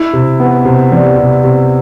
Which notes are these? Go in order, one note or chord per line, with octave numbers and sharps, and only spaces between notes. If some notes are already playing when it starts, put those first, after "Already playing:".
Already playing: E4
C3
B3
C3
G3
C3
C3